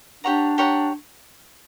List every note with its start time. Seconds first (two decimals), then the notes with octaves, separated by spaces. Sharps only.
0.24 D4 G4 C#5 F#5 A#5
0.58 G4 C#5 F#5 A#5